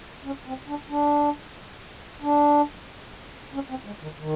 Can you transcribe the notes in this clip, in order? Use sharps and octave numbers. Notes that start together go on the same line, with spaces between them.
C#4
C4
D4
D4
D4
C#4
C4
G#3
D#3
D#3